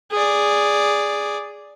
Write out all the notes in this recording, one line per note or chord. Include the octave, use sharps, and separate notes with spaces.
G#4 D5